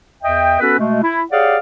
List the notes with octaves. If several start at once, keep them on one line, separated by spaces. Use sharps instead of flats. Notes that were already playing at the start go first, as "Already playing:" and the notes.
E2 D#5 E5 G5
B3 C#4 F#4 A4 B4
B2 G#3 A3
E4
G4 G#4 C#5 D5 F5 F#5